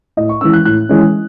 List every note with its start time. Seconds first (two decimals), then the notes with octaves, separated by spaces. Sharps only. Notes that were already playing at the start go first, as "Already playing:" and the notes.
0.17 A2 D#5
0.29 C#6
0.41 E3 G#3 C#4 E6
0.53 F#6
0.65 A2 F#6
0.89 E3 G#3 C#4